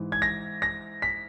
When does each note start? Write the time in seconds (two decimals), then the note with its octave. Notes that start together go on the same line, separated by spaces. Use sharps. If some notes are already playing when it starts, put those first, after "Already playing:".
Already playing: G#2 E3
0.12 G#6
0.22 A#6
0.62 A#6
1.02 B6